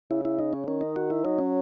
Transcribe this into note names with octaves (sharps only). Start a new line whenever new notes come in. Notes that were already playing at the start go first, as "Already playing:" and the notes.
C#3 E4
E4
D#4
C#4
D#3 C#4
D#4
F#4
E4
F#3 D#4
C#4